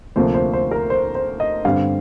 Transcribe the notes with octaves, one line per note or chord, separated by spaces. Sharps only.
D2 C3 F3 A#3 C5
C5
C5
A#4
C5
C5
D#5
G2 D3 G3 C4 F5